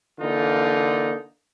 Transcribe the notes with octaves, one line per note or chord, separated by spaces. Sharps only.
D3 E3 A#3 D#4 F4